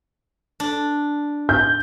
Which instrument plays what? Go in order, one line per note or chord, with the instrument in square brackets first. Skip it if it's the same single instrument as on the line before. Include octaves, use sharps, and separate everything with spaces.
[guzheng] D4
[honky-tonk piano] G6